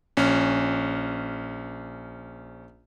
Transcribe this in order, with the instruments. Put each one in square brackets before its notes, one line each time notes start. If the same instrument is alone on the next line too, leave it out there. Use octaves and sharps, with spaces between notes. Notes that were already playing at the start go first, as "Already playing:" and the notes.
[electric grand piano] A#1 C#4